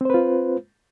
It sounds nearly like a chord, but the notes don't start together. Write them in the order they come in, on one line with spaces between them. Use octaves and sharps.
C4 C5 B4 F4